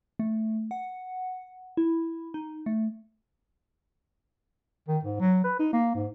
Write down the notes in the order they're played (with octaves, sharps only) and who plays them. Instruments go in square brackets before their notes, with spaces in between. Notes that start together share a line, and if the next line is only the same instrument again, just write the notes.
[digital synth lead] A3
F#5
E4
D#4
A3
[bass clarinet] D#3
G#2
F#3
B4
D#4
A#3
G#2